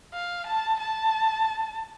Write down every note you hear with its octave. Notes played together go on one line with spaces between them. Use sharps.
F5
A5
A5